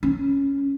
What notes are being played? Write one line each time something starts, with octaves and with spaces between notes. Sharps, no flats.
C#4